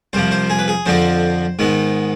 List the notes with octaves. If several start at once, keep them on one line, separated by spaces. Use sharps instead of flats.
C2 C3 F3 C5
C5
G#4
B4
G#4
F2 D3 F3 C4 C5
G#2 D#3 B3